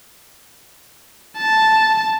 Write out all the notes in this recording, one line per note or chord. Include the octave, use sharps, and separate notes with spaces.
A5